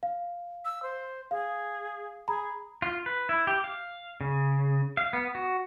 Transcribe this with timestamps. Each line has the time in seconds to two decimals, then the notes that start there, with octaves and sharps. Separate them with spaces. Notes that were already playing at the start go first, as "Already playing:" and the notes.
0.03 F5
0.65 E6
0.83 C5
1.31 G#4 F5
2.28 G#4 A#5 B5
2.82 F4
3.06 B4
3.29 E4
3.47 G4
3.64 F5
4.21 C#3
4.97 F5
5.13 B3
5.35 F#4